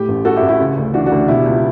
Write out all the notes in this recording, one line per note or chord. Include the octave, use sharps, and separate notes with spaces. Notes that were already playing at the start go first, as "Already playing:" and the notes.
Already playing: A2 G4
A1
E3 F#4 A4
E4 G4
A1
E4 G4
C#3
D2
E3 D4 F#4
D4 F#4
D2
B2 E4 G4
C#2